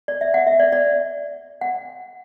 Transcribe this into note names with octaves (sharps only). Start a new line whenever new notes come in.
D5
E5
F#5
E5
D5
D5
F#5